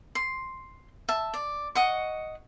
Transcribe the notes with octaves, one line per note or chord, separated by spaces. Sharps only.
C6
E5 A5
D5
D#5 F#5 C#6